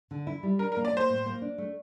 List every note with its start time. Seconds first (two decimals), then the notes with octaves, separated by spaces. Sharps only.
0.11 D3
0.27 E4
0.43 G3
0.59 D4 A#4
0.72 A#4
0.77 A#3
0.85 D5
0.93 A#3 C5
1.09 A2
1.26 A#3
1.42 D4
1.58 A3